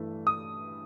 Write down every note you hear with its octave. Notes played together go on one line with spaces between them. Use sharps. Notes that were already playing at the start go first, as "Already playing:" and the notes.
Already playing: G2 E3 A3
D#6